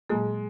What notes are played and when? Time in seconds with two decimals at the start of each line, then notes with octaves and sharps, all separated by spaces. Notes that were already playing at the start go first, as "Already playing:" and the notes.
0.10 A#2 F#3 G#3 A#3